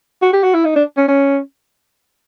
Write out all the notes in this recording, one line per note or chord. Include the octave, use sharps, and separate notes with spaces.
F#4
G4
F#4
E4
D#4
D4
C#4
C#4